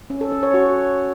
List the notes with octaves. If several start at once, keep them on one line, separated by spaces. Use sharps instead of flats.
C#4
A4
C#4
C#5
F#4